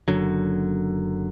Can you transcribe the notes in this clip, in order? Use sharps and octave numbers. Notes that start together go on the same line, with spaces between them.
F#1 F#2 D3 F#3